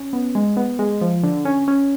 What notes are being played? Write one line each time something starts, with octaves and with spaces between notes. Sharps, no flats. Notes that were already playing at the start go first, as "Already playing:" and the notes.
Already playing: C#4
B3
G#3
B3
G#3
F3
D3
C#4
C#4